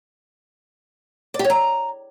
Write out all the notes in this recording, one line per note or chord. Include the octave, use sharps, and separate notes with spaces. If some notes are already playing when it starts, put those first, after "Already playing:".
D5
G4
C#5
A#5